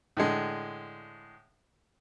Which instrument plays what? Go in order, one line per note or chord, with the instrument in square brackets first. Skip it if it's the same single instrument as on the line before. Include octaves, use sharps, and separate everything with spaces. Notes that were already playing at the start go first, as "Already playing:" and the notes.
[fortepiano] A2 D3 G#3